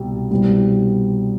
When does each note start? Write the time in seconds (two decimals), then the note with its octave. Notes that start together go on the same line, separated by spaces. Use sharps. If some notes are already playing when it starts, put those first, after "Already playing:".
Already playing: C2 B2 G3
0.31 C2 B2 G3